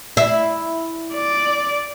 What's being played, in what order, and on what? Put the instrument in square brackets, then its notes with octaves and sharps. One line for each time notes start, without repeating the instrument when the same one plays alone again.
[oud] E4
[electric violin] D5